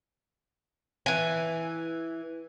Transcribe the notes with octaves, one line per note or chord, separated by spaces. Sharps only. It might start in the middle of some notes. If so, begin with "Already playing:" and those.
E3 G#5